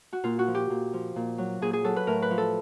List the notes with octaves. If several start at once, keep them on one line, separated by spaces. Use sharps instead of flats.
F#4
A#2 F4
F#4
F3
G4
A#2
F3
A#2
F#3
A#2 G#4
G#4
F#3 A4
B4
A2 A#4
B4
F3
A4